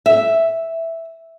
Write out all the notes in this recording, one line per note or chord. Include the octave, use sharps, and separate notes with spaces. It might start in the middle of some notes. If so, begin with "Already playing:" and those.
E5